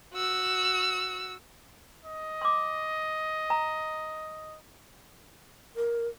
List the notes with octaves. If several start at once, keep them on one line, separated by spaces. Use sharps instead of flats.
F#4 E6
D#5
C6 D6
A#5
A#4